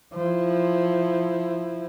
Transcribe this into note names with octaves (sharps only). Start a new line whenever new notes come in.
F3 E4